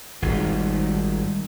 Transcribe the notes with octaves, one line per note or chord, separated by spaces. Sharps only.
G#1 G3 D#4 F4